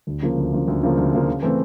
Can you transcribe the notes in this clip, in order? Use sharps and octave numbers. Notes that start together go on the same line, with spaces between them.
D2
C#3 F3 A#3
D2
C#3 F3 A#3
D2
C#3 F3 A#3
D2
C#3 F3 A#3
C#3
E3 A3 C4